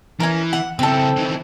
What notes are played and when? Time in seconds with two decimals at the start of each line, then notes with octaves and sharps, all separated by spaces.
0.20 E3 C#4 A#4
0.53 F#5
0.79 C#3 C4 E4 A4
1.16 D#3 E3